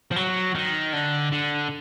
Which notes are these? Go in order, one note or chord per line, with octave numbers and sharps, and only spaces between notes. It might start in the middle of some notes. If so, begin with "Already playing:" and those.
F3
F#3
D#3
D3
D3